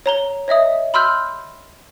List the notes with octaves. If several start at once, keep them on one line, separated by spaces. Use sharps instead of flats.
C#5 A#5 G7
C#5 D#5 E5 D#6
B5 C6 E6 F6 G6